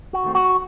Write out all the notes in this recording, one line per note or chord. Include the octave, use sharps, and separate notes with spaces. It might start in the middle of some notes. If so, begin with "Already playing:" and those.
F#4
D#3 A3 C4
F#4